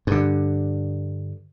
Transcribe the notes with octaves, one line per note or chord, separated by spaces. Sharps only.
G2 D3